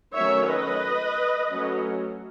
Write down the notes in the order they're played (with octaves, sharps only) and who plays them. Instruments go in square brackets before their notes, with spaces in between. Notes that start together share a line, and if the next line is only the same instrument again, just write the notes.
[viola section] D#3 F#3 A3 C#4 C#5 E5
B4 D#5
F#3 A3 C#4